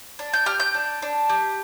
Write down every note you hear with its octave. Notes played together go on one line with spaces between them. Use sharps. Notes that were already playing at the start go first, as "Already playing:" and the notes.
D4
G6
G4 F6
G6
D4
D4
G4